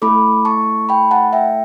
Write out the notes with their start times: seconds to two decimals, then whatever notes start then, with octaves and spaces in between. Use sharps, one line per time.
0.02 A3 E4 A4 B5 D6
0.45 A5 C#6
0.89 G5 B5
1.11 F#5 A5
1.33 E5 G5